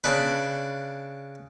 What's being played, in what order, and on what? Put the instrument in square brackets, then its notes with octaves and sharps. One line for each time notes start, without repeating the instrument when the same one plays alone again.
[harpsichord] C#3 D4 B4